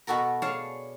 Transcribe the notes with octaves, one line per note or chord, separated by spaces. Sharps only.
B2 B3 F#4 A4 A#4
G#4 C#5 D5 F5 A5